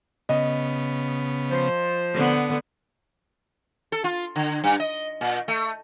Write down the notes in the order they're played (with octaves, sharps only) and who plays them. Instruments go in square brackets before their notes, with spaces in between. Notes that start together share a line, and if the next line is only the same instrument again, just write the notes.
[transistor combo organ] C#3 B3 [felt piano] D#5
[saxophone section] F3 C5
[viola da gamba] D3 B3
[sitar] A4
F4
D3
G2
D#5
A#2
A3